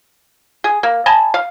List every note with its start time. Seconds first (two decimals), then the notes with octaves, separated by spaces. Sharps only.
0.64 G#4
0.83 A#3
1.06 D#5 G#5 A5 B5
1.34 F5